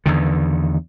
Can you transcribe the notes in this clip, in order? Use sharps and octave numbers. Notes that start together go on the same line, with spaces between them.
E2 D3 D#3